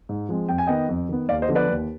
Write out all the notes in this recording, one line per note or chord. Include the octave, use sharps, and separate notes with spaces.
G#2
F3 G#3 C4
F2 G5
G#5
D#3 B3 D#5 G5
F2
D#3 B3
D#2 D5 F5
C5 D#5
D3 F3 B3
B4 D5
D#2